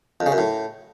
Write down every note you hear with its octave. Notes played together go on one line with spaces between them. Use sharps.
F2
C#3
F#2
A2